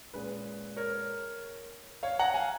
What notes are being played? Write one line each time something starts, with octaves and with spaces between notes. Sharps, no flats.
A#2 G#3 C#4 B4
A#4 C#5
C#5 F5
F#5 A#5
F5 G#5